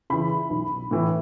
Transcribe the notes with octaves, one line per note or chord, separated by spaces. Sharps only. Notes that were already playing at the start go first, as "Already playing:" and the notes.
C#3 E3 B5
B1
A2 E3